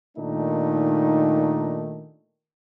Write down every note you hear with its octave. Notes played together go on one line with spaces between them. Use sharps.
A#2 D#3 A3 D4 D#4